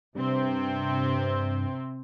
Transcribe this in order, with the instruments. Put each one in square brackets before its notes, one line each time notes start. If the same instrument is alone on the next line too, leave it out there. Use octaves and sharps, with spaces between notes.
[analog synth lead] G2 [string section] C3 C4